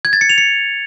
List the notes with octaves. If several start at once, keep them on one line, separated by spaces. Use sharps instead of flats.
G#6
A6
C#7
F7
C#7